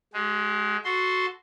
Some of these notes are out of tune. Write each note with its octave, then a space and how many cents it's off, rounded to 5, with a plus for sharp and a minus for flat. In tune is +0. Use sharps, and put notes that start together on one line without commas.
G#3 +20 G4 -30
F#4 +0 A4 +0 C6 +0